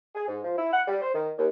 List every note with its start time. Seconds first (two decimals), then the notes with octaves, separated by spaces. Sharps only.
0.15 G#4
0.28 G#2
0.44 F3
0.57 E4
0.72 F#5
0.87 G3
1.02 C5
1.14 D#3
1.38 D#2